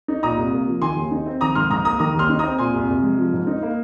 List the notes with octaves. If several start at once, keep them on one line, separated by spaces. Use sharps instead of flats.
D#4
A#2 A#5 D#6
C2
A#3
F3
D#3 G#5 C6
D#2
D#4
C4
D#3 A#5 D#6
G#2 C6 F6
G#2 A#5 D#6
A#3 A#5 D#6
D#3 A#5 D#6
D#2 C6 F6
D#4
A#5 D#6
C4
A#2 G#5 C6
C2
C2
G#3
F3
G#2
D#4
A#3